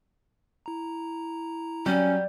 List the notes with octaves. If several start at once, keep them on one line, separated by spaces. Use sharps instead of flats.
E4 A#5
F#3 G3 C#4